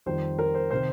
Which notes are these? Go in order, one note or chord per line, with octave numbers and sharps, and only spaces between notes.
F2 D#3 G3 C5
A#4
C5
C3 D#3 C5